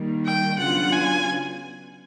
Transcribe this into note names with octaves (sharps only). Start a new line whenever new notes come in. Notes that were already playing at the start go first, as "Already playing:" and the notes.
Already playing: D#3 G3 A#3
G5
C#3 F#3 B3 D4 F4 F#5
G#5